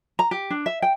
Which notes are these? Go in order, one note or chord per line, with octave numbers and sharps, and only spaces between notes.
A#5
G4
D4
E5
G5